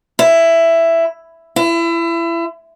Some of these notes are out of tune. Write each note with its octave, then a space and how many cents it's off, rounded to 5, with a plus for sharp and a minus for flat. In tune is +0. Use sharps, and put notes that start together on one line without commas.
E4 +10
E4 +30